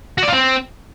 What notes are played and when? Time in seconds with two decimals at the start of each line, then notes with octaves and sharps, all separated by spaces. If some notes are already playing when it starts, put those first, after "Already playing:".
0.18 F#4
0.23 D5
0.28 F4
0.33 C4